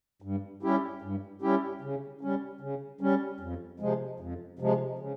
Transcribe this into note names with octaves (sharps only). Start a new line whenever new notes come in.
G2
G3 C#4 E4 G4
G2
G3 C#4 E4 G4
C#3
G3 C#4
C#3
G3 C#4
F2
C3 F3 G#3
F2
C3 F3 G#3
C#3